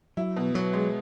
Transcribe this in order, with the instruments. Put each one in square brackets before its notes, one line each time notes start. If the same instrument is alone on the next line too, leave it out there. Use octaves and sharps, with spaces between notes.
[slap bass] F#3 [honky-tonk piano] E4
[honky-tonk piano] B2
[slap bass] F#3 [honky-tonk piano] B3
[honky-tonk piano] G#3